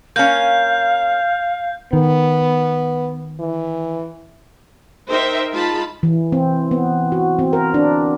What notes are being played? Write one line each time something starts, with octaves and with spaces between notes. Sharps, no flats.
A#3 C#4 F5 G6
D#3 B3
E3
D#4 A#4 C5 E5 G5
G#3 D#4 F4 A5 B5
E3
C4
B3
F#4
C4
A#4
D4